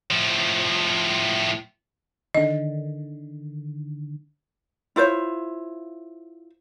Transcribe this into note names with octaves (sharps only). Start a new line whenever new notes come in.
A2 F3
D3 D#3 D#5
E4 F4 C5 C#5